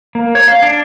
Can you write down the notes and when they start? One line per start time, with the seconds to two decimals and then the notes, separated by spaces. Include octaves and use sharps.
0.15 A#3
0.35 C#5
0.48 F5
0.63 D4